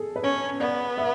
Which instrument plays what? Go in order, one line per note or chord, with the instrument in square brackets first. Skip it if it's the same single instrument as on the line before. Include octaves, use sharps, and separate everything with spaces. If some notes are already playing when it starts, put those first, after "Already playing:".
Already playing: [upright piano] G#4 A4
B4
[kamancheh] C#4 [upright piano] C#5
[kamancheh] B3 [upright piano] D5
[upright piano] E5